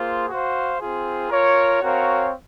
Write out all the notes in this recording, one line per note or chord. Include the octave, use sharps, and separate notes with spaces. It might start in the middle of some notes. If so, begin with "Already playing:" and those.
Already playing: A#3 F4 G#4 C5
F#4 C5 F5
C4 F4 G#4
F4 A#4 C#5
C4 F#4 A#4 C#5 F5